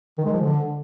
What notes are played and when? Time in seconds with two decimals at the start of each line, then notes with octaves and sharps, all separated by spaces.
0.18 D#3
0.25 G#3
0.33 F3
0.40 D3